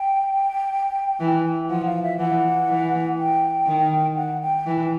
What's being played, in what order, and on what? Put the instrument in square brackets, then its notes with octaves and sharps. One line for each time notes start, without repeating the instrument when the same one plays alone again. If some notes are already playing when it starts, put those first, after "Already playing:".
Already playing: [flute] G5
[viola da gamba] E3
[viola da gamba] F3 [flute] F#5
[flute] F5
E5
[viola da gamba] E3 [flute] F#5
[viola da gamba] E3
[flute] G5
[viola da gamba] D#3
[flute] F#5
G5
[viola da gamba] E3